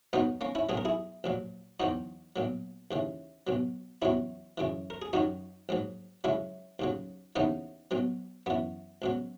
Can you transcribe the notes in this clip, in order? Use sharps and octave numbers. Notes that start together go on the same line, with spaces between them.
B1 B2 F#3 B3 D#4
A#3 C#4
C#4 E4
B1 B2 F#3 G#4
A#4
E4 G#4
A#1 A#2 F#3
E2 D#3 F#3 D#4 F#4
B1 A#2 F#3
D#2 C#3 E3
B1 B2 F#3
E2 B2 F#3 C#4 E4
F#2 C#3 E3
A#4
G#4
F#2 D#3 F#3 D#4 F#4
A#1 G#2 F#3
C#2 C#3 F#3 C#4 E4
D#2 C#3 F#3
D#2 C#3 E3 B3 D#4
B1 B2 F#3
F#2 E3 B3
C#2 B2 F#3